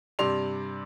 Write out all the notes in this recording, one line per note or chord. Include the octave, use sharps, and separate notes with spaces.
G2 C3 D5 C6 F7